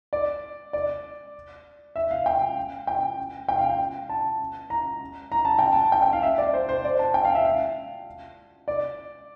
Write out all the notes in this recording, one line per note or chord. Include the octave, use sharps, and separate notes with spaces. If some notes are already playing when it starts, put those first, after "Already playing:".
D5
D5
E5
F5
G5
G5
G5
F5
G5
A5
A#5
A#5
A5
G5
A5
G5
G5
F5
E5
D5
C5
C5
D5
A5
G5
F5
E5
F5
D5